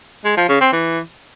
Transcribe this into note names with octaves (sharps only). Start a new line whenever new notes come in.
G#3
F3
C#3
C4
E3